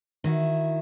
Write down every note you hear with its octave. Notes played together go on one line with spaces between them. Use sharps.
D#3 E4 F#4